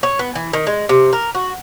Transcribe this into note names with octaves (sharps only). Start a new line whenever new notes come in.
C#5
B3
E3
D#3
G#3
C3
A#4
F#4